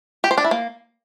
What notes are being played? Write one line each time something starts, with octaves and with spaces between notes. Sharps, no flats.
G4
C5
D4
E4
A#3